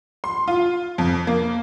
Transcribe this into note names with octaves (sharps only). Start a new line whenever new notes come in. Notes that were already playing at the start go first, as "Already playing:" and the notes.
C6
F4
F2
A#3